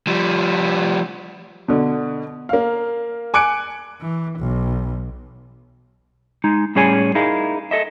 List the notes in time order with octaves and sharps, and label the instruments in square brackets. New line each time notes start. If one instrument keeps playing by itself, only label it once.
[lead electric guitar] F3 G3
[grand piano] B2 D3
A#3 F5
G#5 D6 F#6 C#7 D7
[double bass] E3
B1
[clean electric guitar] G#3 D#4
A2 G3 C#4 G#4 C#5 G#5
D#4 E4 G#4 A#4 D#5 F5
A4 D#5 E5